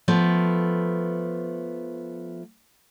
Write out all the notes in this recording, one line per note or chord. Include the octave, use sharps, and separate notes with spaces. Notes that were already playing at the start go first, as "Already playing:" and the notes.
F3 A3 B3